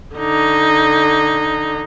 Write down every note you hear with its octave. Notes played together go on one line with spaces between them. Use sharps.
D3 D#4